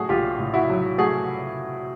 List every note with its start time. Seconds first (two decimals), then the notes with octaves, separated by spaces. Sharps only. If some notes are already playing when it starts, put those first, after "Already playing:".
Already playing: A2 F#3 A3 F#4 G#4
0.09 A#1 F4 G4
0.39 A2
0.54 E4 F#4
0.69 F#3
0.98 A3 F#4 G#4